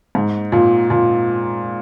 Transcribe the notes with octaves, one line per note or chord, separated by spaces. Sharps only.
G#2
A#2
A#2